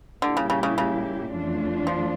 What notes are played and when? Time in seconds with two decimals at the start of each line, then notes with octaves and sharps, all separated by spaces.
0.22 A#2 D3 G3 A#3 E4 G4
0.37 C#3
0.50 C#3
0.63 C#3
0.78 C#3
1.32 F2 E3 A3 D4 F4
1.87 F3